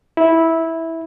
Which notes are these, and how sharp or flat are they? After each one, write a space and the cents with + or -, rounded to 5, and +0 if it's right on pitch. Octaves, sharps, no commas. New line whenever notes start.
E4 -10